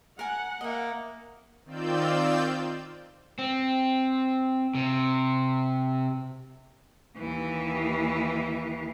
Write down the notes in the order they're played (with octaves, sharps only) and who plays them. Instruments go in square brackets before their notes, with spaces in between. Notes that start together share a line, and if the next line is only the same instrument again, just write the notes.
[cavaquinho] A#4 G#5 [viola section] F#5
[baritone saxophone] A#3 [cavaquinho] D#5 E5
[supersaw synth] D#3 C4 F4 D5 E6 G6
[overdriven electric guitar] C4
C3
[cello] D#2 E3